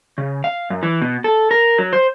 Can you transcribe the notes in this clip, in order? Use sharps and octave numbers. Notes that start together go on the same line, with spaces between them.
C#3
F5
F#2
E3
B2
A4
A#4
F#3
C5